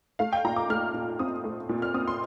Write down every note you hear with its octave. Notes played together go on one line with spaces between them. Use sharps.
A3 F5
G5
A#2 A#5
D6
A3 F6
A#2
C4 D#6
A3
A#2
F6
C4 D#6
C6